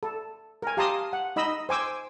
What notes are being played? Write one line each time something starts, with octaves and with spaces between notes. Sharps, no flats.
A4
A#4 G#5
G4 F5 A5 A#5 C6 D#6
F#5
D#4 D#5 B5 E6
C5 G#5 D6 E6